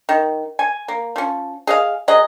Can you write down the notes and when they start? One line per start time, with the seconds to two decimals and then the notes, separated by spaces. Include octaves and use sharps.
0.09 D#3
0.59 G#5
0.88 A#3
1.16 F3 C#4
1.67 G#4 D#5 F5
2.08 F#3 G#4 D#5